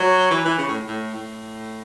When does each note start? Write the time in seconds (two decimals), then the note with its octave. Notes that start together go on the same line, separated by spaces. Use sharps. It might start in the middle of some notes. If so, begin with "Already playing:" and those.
Already playing: F#3
0.31 E3
0.45 E3
0.58 C#3
0.68 A2
0.87 A2
1.15 A2